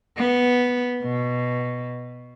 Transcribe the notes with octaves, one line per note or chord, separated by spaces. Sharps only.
B3
B2